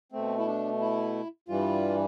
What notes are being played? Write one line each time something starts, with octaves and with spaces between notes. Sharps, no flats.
B2 A3 C4
E4
D4
E4
G2 E3 G3 F4